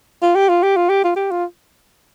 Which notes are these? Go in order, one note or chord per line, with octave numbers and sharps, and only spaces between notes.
F4
G4
F4
G4
F4
G4
F4
G4
F4